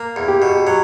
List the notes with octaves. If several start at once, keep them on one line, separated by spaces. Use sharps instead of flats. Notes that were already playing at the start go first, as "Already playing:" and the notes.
Already playing: A#3
E2
G4
B2
F#3